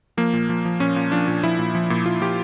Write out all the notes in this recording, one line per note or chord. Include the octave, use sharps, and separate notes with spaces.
F3 A#3
A#2
F3
F3
A#2 C#4
A#2
F3 D4
A#2
F3 E4
A#2
F3
A#2
A#2 F4
F3 G4